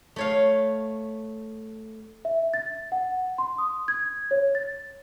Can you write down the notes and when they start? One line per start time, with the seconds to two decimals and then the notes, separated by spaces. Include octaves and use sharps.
0.16 A3 C#5 F5
2.25 E5
2.54 A6
2.92 F#5
3.38 C6
3.58 D#6
3.88 G#6
4.31 C#5
4.55 A6